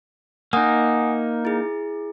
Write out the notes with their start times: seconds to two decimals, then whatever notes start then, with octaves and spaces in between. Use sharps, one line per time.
0.53 A#3 D#4 F#5 G#5 D#6
1.45 E4 G#4